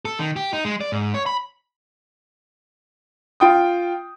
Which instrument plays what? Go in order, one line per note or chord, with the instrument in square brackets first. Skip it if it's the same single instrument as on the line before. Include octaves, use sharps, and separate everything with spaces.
[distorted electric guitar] A4
D#3
G4
D#4
G#3
D5
G#2
C#5
B5
[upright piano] F4 G5 D#6